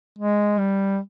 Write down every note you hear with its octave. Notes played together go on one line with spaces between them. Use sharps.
G#3
G3